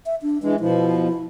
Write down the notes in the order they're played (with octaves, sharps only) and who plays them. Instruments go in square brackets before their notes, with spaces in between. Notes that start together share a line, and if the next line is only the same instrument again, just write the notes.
[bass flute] E5
D4
[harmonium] E3 G#3 [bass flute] D4
[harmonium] B2 F3 [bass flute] E4